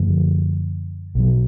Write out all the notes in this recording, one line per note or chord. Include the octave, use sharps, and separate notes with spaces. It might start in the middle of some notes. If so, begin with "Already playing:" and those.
Already playing: F#2 D3 F3 A3
B1 B2 F#3